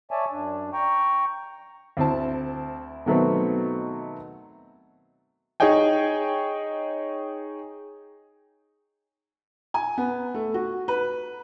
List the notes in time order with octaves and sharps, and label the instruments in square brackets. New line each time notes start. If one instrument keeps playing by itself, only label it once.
[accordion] C#5 D5 E5 G#5 A5
F#2 D4
G5 A#5 C#6
[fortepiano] D2 C4 E4 A5
B2 D#3 F#3 A3 B3 C4
[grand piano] D#4 G#4 C#5 D#5 G5 G#5
[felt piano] G#5
B3
A3
F#4
B4